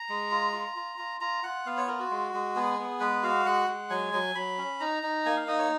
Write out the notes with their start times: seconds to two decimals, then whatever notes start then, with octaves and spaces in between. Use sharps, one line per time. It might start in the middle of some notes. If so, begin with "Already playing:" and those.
Already playing: A#5
0.09 G#3
0.31 F4
0.54 F4
0.76 F4
0.98 F4
1.21 F4 A#5
1.43 F4 F#5
1.66 B3 F5
1.77 C#5
1.88 F4 A#4
1.99 F#4
2.11 G#3
2.34 G#3
2.55 B3 G#4
2.79 B3
3.00 G#3 B4
3.23 F#4 F5
3.46 G#3 F#5
3.68 G#3
3.90 F#3 G#5
4.14 F#3
4.35 F#3 B5
4.58 C#4
4.80 D#4 A#5
5.03 D#4
5.26 A#3 G#5
5.36 F5
5.48 D#4 D#5
5.59 C#5